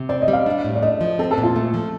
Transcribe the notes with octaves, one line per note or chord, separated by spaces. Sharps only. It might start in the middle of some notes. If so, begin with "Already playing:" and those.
Already playing: C3
C4 D5
D#5
G3
F5
D4
A2
D5
A3 D#5
F3
C4 A4
A4
A#2
F4
A3
F3